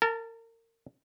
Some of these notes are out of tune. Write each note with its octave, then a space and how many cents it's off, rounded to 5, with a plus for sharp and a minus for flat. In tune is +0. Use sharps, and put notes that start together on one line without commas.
A#4 -30 A5 +0